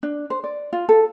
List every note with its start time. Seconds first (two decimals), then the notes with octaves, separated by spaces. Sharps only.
0.03 D4
0.30 C5
0.44 D5
0.73 F4
0.89 A4